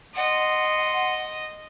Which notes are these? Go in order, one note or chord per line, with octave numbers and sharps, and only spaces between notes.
D#5 F#5 C6